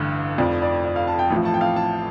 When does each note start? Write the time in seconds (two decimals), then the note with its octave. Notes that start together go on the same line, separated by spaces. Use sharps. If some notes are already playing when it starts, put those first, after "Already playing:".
Already playing: A1 G2 D3
0.38 F1 F2 F3 D5
0.62 D5
0.85 D5
0.96 F5
1.07 A5
1.19 G5
1.30 A1 A2 F3
1.45 A5
1.54 G5
1.61 F5
1.76 A5